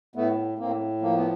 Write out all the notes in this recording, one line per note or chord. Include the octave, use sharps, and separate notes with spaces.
A2 A3 B3
A2 A#3 C4
F3 A#3
B3